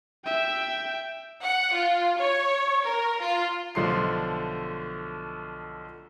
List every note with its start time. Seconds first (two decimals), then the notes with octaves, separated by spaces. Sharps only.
0.25 E5 G5
1.41 F#5
1.72 F4
2.18 C#5
2.84 A#4
3.20 F4
3.75 B1 D3 F3 A3 C6 C7